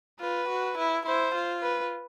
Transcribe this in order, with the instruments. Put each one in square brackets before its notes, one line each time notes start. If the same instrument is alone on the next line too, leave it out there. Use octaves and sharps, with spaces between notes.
[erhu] F4 [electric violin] B4
[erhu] F#4
E4
[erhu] E4 [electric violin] C5
[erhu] F4
[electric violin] B4